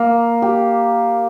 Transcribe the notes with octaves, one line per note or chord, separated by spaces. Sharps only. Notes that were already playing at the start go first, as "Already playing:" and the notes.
Already playing: A#3
G4